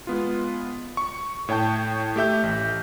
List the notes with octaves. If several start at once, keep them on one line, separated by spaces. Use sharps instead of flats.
G#3 B3 F4
C#6
A2 C#5 G5 A5 G6
A3 G4 E5 G6
A1